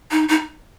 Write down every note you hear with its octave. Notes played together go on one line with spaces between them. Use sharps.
D#4
D#4